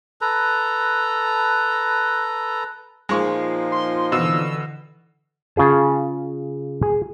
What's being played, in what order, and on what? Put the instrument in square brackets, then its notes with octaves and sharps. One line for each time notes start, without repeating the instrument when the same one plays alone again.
[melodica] A4 B4 A#5
[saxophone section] A#2 F3 D#4 [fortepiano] G#3 C#6
[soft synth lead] C6
[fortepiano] B2 [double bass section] D3 E3 [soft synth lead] E6
[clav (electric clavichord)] C#3 F4 G#4 A5
G#4